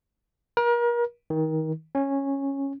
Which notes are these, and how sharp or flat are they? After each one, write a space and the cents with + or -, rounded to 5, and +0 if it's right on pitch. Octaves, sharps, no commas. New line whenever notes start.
A#4 +35
D#3 +25
C#4 -10